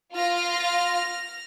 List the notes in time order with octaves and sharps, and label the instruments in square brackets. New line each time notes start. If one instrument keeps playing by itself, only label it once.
[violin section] F4 [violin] F6 A#6